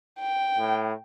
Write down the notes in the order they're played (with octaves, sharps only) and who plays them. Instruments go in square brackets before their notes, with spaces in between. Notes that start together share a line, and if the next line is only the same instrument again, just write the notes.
[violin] G5
[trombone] A2